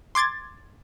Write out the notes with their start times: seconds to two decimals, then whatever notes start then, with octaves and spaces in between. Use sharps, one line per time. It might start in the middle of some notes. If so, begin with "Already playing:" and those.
0.15 C6 D6 G#6 A6